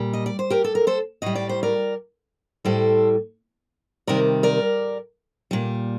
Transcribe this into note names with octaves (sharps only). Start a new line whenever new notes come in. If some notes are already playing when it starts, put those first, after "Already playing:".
Already playing: A#2 G3
D#5
D5
C5
G4 A#4
A4
A#4
A4 C5
A2 G3 D#5
D5
C5
A#4 D5
A2 G3 A4 C5
C3 D#3 G3 A#4 D5
A#4 D5
A#2 G3